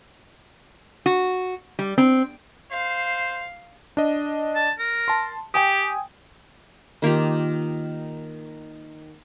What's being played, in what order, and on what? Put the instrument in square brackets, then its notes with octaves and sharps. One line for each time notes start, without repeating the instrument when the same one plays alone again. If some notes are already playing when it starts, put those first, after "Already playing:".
[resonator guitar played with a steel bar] F#4
G3
C4
[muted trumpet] C5 [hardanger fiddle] F5
[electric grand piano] D4 D#5
[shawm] A5
A#4
[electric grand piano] A5 C6
[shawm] G4 [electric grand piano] G5 G#5 D#6
[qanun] D#3 A#3 F4 G4